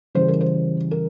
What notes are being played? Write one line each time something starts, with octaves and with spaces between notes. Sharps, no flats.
C#3 E3 G3 C5
A#4
C5
A#4